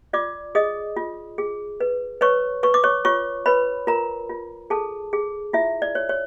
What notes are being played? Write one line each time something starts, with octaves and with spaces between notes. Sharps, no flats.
F4 D5 D6
G#4 D#5 D#6
F4
G#4
B4
B4 C#5 C#6
B4 C#6
D6
C#5 C#6
F4 C#5 C#6
B4 C#5 B5
F4 A#4 A#5
F4
G#4 A4 A5
G#4
E4 F4 E5
D5
C#5
C#5